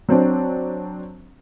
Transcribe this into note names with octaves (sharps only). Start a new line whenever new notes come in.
F#3 C4 D4